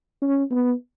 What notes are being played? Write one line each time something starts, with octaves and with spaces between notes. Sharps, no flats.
C#4
B3